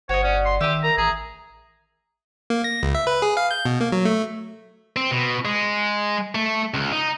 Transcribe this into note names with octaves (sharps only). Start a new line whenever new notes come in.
G1 F#4 C5 C#5 D#5
C#4 D5
C6
D#3 G4 E5 D#6
A#4 A#5
A1 G#4 A#5
A#3
A#6
C#2
E5
B4
G#4
F5
G6
B2
A#3
F#3
A3
C4
B2
G#3
A3
C#2
D#4